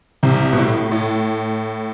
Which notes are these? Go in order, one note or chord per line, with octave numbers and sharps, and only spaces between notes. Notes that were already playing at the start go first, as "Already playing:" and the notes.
C2 C3
B2
A2
A2